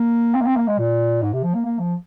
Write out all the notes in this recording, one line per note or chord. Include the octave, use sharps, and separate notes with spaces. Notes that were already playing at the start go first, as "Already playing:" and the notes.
Already playing: A#3
C4
A#3
C4
A#3
G#3
A#2
G#2
C3
F3
A#3
A#3
F3